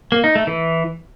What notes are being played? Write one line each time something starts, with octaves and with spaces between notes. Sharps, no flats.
A#3
D#4
A3
E3